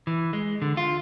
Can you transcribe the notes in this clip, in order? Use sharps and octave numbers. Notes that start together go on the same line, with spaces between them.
E3
G#3
D3
F4